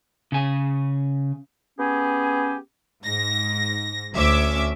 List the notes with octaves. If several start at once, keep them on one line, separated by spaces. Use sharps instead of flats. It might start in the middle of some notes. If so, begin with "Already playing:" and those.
C#3 G#5
B3 C#4 G4 G#4 G#5
G#2 A#6
D2 C#4 E5 D6